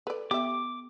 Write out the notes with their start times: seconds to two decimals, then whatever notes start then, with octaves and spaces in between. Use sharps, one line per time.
0.07 A4 B4 D5
0.31 B3 G4 E5 D6